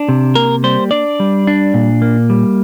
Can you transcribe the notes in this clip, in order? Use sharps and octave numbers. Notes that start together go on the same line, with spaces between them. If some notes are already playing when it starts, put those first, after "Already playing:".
Already playing: D4
C3
A#3 A#4
G3 C5
D4 D5
G3
D4
A#2
A#3
G3